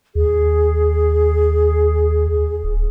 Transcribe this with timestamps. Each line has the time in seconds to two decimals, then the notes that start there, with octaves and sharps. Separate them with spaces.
0.15 D#2 G#4
2.64 D1